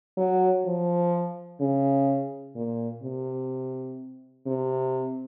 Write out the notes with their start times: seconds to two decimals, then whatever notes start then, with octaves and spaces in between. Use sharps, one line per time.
0.17 F#3
0.66 F3
1.60 C#3
2.56 A#2
3.03 C3
4.46 C3